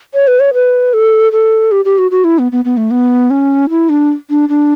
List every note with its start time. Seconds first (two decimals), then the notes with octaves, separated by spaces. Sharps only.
0.14 C#5
0.27 B4
0.40 C#5
0.54 B4
0.94 A4
1.32 A4
1.72 G4
1.85 G4
1.98 F#4
2.11 F#4
2.24 E4
2.39 B3
2.52 B3
2.65 B3
2.77 A3
2.91 B3
3.30 C#4
3.70 E4
3.89 D4
4.30 D4
4.49 D4